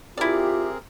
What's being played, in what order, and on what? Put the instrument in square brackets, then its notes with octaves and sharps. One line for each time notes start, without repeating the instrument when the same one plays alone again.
[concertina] C4 G#4 A#4 [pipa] E4 D5 [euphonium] F4 [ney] G4